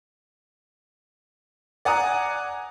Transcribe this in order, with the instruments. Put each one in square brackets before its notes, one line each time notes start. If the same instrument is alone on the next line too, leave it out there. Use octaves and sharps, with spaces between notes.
[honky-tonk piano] D5 F#5 G#5 A#5 D#6